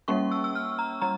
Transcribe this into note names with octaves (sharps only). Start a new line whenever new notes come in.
G3 A#3 C#4 C#6
E6
E6
F6
A#5
G3 A#5